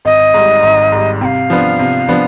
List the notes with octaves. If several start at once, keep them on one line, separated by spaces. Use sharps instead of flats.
G#1 D#5
G#2 G3
G#1
G#2 G3
C3 F5 G5
F3 B3 D4
C3
F3 B3 D4